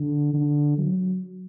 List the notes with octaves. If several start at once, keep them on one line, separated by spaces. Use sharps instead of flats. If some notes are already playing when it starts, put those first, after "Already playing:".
Already playing: D3
D3
F#3